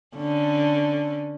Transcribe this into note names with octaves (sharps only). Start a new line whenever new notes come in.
D3 C#4